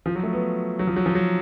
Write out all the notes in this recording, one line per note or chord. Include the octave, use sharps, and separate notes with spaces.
F3
F#3
A3
B3
F#3
F3
F#3
F3
F#3